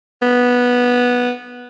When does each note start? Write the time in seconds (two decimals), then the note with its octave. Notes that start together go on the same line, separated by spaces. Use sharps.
0.22 B3